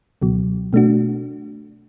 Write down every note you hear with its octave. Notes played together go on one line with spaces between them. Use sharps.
C#2 B2 F#3
B2 A3 D4 F#4